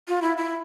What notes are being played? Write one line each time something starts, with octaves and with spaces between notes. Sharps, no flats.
F4
E4
E4